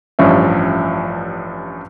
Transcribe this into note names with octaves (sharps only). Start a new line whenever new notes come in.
A1 G2 F3 C#4 E5